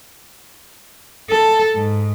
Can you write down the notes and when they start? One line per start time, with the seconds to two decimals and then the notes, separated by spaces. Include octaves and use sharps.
1.30 A4
1.75 G#2